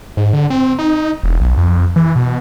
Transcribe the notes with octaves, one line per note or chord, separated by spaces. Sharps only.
G#2
D3
C4
D#4
E1
B1
F2
E3
B2